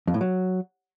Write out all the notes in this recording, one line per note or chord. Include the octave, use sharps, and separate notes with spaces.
F2
A2
F#3